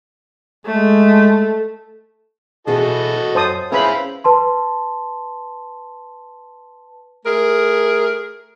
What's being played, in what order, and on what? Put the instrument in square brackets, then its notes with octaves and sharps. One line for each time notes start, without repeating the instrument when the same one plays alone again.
[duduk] G#3 [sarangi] A3
[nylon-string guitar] B2 E3 G#4 [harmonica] F#4 A4 D#5
[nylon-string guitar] F#2 [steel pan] C5 A5 D#6
[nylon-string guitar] C#4 [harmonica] E4 G#4 F5 [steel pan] B4 C5 B5
[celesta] B4 A5 C6
[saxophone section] A3 G#4 A#4